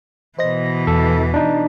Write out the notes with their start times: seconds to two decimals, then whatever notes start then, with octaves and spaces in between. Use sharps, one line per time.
0.39 B2 E3 C5 D#5 A#6
0.87 E2 A4
1.34 D4 D#4